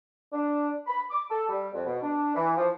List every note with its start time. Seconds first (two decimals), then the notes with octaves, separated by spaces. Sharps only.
0.33 D4
0.87 B5
1.11 D6
1.30 A4
1.49 G3
1.74 F2
1.86 B2
2.02 D4
2.35 E3
2.57 F3